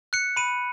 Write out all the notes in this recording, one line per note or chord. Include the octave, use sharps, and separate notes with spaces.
F#6 C#7
B5 D#7